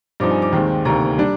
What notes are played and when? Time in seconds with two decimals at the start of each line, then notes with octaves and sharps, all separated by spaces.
0.20 G2 F3 C4 D#4 D6
0.31 G#5
0.42 D6
0.52 D#2 D#3 G#3 C4
0.85 D2 C3 D#3 A#3 A#5
1.18 G3 D4